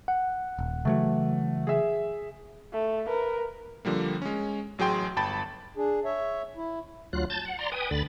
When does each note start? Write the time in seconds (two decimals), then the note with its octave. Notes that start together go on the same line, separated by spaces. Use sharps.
0.08 F#5
0.59 D#1
0.85 C#3 E3 F#3 A3
1.67 G#4 E5
2.73 A3
3.07 A#4 B4
3.85 D3 F3 G3 A#3
4.22 G#3 C#4
4.78 A1 F#3 G#4 G5 C6
5.16 G1 G5 A5 B5 A6
5.75 D4 G#4
6.05 C#5 E5
6.57 E4
7.13 D2 F#3 F4 F#6
7.30 A5 G6 A6
7.45 F#5
7.59 D5 A#5 C6
7.72 B4 G5 G#5 D#6
7.91 D2 D3 B5 A6